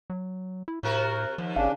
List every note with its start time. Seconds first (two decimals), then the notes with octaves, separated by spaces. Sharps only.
0.10 F#3
0.68 E4
0.83 A2 C3 F#4 A#4
1.38 D#2 F3
1.56 G#1 C#3 D4 F5